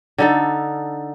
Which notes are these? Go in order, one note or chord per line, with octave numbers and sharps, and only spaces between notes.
D3 D#4 A4